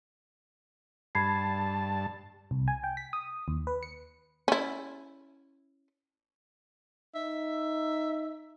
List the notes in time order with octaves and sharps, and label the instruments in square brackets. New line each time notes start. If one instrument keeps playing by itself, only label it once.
[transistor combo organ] G2 A5 [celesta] B5 G#6 C7
[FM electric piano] C2
G#5
G5
B6
D#6
D#2
B4
C#7
[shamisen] C#4 E4
[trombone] D#4 [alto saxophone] E5